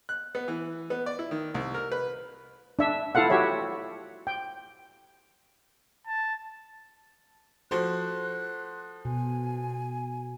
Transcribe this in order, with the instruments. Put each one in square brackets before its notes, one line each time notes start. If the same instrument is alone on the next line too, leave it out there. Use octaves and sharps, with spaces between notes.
[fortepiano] F#6
B3
E3
B3
D5
E4
D#3
C2
A#4
B4
[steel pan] D4 E5
E4 F4 A4 F5 F#5
F#4 G4 C#5 E5
G5
[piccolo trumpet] A5
[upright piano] F3 F#4 C5 [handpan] A4 [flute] F#6
[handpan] B2 [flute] G#5